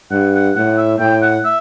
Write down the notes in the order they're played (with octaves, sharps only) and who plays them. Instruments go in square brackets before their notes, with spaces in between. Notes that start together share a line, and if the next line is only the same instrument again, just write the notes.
[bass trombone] G2 [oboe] F#5
[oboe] F#5
[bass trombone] A2 [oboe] F#5
[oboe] E5
[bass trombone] A2 [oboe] G5
[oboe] F#5
E5